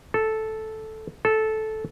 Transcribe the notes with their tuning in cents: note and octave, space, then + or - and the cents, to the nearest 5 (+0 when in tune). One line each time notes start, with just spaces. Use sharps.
A4 -5
A4 -10